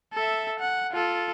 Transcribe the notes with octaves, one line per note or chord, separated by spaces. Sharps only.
A4 E5
F#5
F4 A4